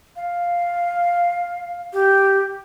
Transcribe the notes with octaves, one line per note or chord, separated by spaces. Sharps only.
F5
G4